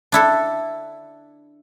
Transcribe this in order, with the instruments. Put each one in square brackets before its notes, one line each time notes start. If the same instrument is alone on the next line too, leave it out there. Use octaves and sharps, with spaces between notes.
[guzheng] D4 E4 A4